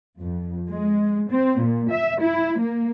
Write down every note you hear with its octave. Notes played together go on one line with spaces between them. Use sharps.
F2
G#3
C4
A#2
E5
E4
A#3